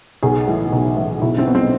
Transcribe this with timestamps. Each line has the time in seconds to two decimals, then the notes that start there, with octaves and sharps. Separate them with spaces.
0.23 B1 G#4
0.48 A2 E3
0.73 B1
0.97 A2 E3
1.22 B1 E4
1.38 C4
1.46 B2
1.55 C4